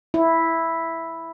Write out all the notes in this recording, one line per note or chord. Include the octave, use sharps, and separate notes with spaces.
E4